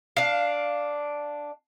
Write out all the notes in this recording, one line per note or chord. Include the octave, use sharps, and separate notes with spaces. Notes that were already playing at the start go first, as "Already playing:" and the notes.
D4 F5